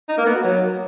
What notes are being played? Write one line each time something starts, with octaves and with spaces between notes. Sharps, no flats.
D#4
A#3
B3
F#4
F#3